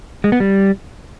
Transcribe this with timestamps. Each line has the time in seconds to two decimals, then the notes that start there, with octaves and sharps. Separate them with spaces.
0.24 G#3
0.32 B3
0.40 G3